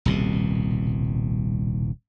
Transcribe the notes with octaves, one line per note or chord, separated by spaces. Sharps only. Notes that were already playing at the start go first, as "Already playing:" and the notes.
D#1 C2 B2